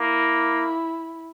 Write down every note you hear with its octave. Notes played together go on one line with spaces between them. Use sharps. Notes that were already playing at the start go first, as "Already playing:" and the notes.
Already playing: A#3 E4